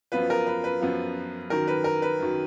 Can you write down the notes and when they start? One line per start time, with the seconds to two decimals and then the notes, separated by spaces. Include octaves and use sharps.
0.12 F#2 F3 B3 F4 B4
0.30 A#4
0.46 B4
0.64 B4
0.81 F#2 F3 B3 F4
1.50 F#2 D#3 F#3 A#4
1.67 B4
1.84 A#4
2.02 B4
2.20 F#2 D#3 F#3